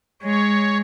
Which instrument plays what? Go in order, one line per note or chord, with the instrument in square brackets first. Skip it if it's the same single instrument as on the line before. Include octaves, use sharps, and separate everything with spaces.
[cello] G#3 [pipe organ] C#5